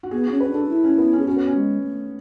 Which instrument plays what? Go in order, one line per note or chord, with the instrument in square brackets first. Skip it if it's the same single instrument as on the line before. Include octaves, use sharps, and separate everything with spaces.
[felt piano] F#4
[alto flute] B3 [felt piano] G#4
[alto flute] C#4 [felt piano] F#4
[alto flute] C#4 [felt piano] B4
[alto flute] D4
[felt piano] A4
[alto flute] D4
E4
[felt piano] C#4
B3
C#4
[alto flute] G#4
[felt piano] C#4 [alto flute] F#4
[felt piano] B3
C#4
[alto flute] G#3
B3
A3